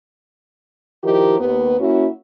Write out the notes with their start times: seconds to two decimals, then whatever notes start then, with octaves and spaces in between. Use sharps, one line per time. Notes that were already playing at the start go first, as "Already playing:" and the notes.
1.04 D#3 F3 D#4 E4 G4 A#4
1.40 D#2 B3
1.79 A#3 C#4 E4 F#4